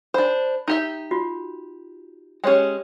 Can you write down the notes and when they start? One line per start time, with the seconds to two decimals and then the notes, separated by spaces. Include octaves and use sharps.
0.14 D4 C5 B5
0.68 D#4 G4 E5
1.11 F4 F#4
2.44 G#3 C#4 G4 C#5 G5